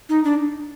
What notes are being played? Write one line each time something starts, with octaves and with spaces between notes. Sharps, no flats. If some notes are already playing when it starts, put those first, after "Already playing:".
D#4
D4